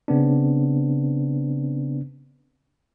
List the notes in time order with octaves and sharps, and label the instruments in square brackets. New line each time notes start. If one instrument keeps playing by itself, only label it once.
[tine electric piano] C#3 B3 C4 D4